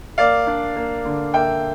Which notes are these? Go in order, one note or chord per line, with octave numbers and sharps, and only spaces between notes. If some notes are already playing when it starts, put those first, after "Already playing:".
A#3 D5 F5
D4
A#3
D3
A#3 E5 G5